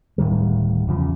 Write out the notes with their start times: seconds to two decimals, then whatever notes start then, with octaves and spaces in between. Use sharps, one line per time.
0.18 D1 A2 D#3 G3
0.87 E2 C#3 F3